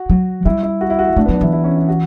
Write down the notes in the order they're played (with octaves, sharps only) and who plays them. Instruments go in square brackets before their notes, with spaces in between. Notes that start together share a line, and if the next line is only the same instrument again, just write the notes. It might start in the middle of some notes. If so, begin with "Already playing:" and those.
Already playing: [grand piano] F#4
[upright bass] F#3
[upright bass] G3 [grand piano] E4
[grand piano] E4
F#4
E4
F#4
E4
[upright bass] A3 [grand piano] D4
[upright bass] F#3 [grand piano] B3
[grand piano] D4
[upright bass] E3 [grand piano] E4
[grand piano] E4
C#4
E4
F#4